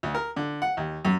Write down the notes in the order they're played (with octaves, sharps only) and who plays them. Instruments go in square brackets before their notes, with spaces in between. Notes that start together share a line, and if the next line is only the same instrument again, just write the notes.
[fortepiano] D2
A#4
D3
F#5
D#2
F#2